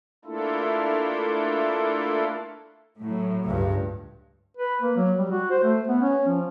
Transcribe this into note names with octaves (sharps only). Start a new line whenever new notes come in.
A3 A#3 D4 E4 F4 A4
A2 F#3
C#2 G2
B4
A#3
F#3
G3
F#4
C5
A3
B3
C#4
F3